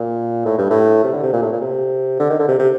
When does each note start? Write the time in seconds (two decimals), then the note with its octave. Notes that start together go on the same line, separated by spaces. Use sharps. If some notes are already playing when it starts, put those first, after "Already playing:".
Already playing: A#2
0.45 A2
0.58 G2
0.70 A2
1.04 C3
1.13 D3
1.23 C3
1.33 A#2
1.42 A2
1.52 A#2
1.61 C3
2.20 D3
2.30 D#3
2.40 D3
2.48 C3
2.59 C3